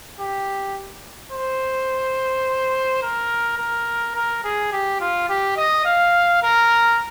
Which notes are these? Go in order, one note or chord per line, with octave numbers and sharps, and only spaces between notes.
G4
C5
A#4
A#4
A#4
G#4
G4
F4
G4
D#5
F5
A#4